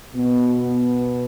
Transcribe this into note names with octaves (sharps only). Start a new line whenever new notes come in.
B2 B3